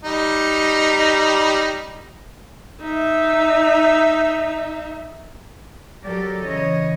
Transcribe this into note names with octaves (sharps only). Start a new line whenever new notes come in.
G3 D#4
D#4 E5
F#3 G4 A4 A#4 D5
C#3 E3 C#5 D#5